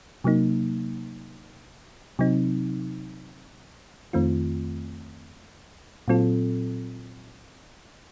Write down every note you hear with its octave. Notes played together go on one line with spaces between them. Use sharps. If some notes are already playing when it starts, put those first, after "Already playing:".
C3 F#3 A#3 D#4
C3 F#3 C4 D#4
F2 D#3 A3 C4 F4
A#2 F#3 C4 F4 A4